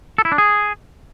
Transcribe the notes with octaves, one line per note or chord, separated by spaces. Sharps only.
A4
E4
D4
G#4